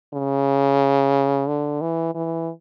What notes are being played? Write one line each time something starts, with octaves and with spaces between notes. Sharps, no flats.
C#3
D3
E3
E3